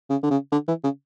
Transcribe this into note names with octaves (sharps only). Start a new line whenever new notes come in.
C#3
D3
C#3
D3
E3
C#3